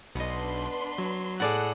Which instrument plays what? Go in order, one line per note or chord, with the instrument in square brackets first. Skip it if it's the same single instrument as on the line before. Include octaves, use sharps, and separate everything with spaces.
[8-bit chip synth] B1 [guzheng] B3 D#5 [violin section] D4 B4 C6
[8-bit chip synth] F#3
[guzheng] A2 D5 [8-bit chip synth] G#4 A4 F#5 [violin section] F#6